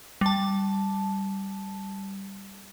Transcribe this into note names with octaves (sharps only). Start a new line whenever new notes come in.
G3 A5